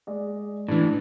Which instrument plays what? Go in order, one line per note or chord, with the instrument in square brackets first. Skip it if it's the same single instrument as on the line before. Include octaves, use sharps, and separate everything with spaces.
[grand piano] G#3 D5
[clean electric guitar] A2 E3 [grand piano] D4